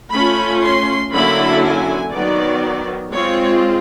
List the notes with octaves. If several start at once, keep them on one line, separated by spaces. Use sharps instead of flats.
A3 C#4 F4 B5
C6
D3 F#3 A#3 C#4 E4 B5
G#5
D#3 F#3 B3 D5
G#3 C4 F4 C#5